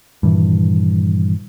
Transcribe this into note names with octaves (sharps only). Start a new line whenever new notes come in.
G2 A#2 D#3 E3